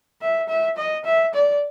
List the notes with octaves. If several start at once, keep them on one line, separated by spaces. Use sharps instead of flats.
E5
E5
D#5
E5
D5